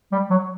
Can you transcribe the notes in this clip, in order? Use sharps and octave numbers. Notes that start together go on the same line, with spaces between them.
G3
F#3